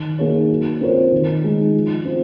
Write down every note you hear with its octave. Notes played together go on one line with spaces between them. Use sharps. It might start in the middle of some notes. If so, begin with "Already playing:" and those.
Already playing: D#3
A#3 D#4 G#4 C#5
F#3
C4 F4 A#4 C#5
D#3
G#3 D#4 G#4
F3
C4 F4